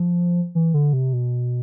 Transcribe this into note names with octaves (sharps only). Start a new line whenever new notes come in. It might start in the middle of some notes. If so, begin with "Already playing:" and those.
Already playing: F3
E3
D3
C3
B2